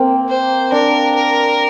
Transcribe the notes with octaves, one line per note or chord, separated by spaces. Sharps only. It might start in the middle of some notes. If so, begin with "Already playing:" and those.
Already playing: A#3 C4
C5
D4 A#4
A#4